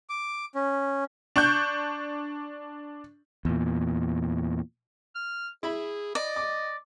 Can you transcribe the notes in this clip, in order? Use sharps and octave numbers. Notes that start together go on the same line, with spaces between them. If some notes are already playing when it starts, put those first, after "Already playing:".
D6
C#4
D4 C#6 F#6 G6
E2 A#2
F6
E4 G#4 B5
D5 D#5
D6